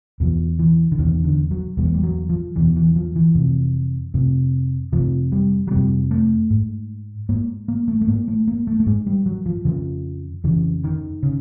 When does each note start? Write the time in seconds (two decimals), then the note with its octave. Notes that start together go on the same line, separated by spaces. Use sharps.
0.20 E2 B2 F3
0.59 E3
0.92 D3
0.98 E2 B2 D#3
1.24 D3
1.51 F#3
1.77 E2 B2 G3
1.85 G#3
1.94 G3
2.03 F#3
2.29 F3
2.56 E2 B2 E3
2.76 E3
2.96 F3
3.16 E3
3.35 F2 C3
4.14 F2 C3
4.92 F2 C3 F3
5.32 G3
5.67 F#3
5.71 F2 C3 G3
6.11 A3
6.50 G#2
7.29 G#2 A#3
7.68 A#3
7.88 A3
8.01 A3
8.08 G#2 A#3
8.28 A3
8.47 A#3
8.67 A3
8.80 A3
8.86 G#2 G#3
9.06 G3
9.26 F#3
9.46 F3
9.65 F2 C#3 F3
10.44 F2 C#3 E3
10.84 D#3
11.23 C#3